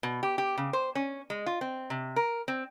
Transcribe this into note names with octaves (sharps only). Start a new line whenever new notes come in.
B2
G4
G4
C#3
C5
C#4
G#3
F4
C4
C3
A#4
C4